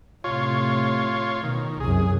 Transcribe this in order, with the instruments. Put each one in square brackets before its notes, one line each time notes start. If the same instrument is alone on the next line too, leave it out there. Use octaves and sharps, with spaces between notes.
[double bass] A2 C3 [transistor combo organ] F4 C#5
[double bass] B2 [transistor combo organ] D#3
[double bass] C2 F#2 [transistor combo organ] G#4